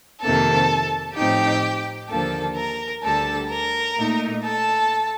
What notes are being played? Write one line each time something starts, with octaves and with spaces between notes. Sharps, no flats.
F2 C3 D#3 A#3 A4 A5
A2 F3 C4 D#4 G4 G5
D#2 D3 F3 A#3 A4 A5
A#4 A#5
D2 D3 G3 A4 A5
A#4 A#5
A#2 A3 D#4
A4 A5